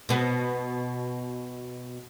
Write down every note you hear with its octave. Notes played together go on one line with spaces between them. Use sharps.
B2 B3